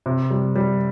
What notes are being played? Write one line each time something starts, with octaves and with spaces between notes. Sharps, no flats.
C3
G3
G3